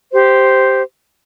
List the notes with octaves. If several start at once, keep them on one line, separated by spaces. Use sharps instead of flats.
G4 C5